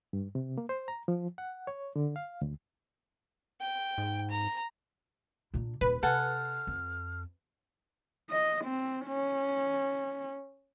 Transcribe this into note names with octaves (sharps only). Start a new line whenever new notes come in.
G2
C3
A#3
C5
A#5
F3
F#5
C#5
D3
F5
D2
G5
G#2
A#5
A#2 D4
D#1 A#2 B4
C3 A4 F#5 G#5 F6
F2
D#5
C4
C#4